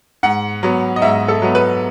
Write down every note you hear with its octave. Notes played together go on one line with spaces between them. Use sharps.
G#2 F#5
F#3 B3
D#5
G#2 E5
A4
F#3 B3
B4